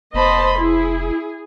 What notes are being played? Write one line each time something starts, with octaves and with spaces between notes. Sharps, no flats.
F1 B3 C5 D#5 A5 B5 C6
E4 G#4